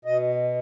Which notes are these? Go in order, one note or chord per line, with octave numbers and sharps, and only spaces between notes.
B2 D#5